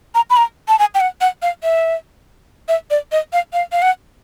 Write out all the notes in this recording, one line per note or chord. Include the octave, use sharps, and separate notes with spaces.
A#5
B5
A#5
A5
G#5
G5
F#5
F#5
F5
E5
E5
D5
D#5
F5
F5
F5
F#5